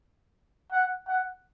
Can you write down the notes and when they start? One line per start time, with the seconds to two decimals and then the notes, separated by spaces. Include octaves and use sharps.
0.72 F#5
1.08 F#5